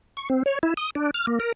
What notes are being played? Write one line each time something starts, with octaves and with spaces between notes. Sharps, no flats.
C#6
C4
C#5
E4
D#6
D4
F6
A#3
A#4